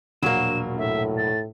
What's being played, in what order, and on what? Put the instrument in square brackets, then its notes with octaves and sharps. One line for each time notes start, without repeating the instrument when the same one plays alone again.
[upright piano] E1 A#1 D4 [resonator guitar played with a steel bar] F#3 A#3 [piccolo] E7
[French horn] A2 [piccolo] E5
[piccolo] A6